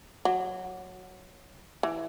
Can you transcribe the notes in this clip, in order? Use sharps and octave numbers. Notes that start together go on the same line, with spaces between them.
F#3
E3